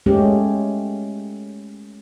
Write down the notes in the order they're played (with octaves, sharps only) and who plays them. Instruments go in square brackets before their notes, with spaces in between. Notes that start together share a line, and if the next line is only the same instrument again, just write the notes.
[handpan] G#3 A3 C#4 G4